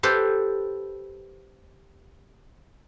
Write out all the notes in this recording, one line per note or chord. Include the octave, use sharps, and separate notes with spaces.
G4 A4 B4 C5